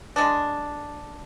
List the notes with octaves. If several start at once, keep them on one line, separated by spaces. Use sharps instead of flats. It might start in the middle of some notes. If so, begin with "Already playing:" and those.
G#3 D4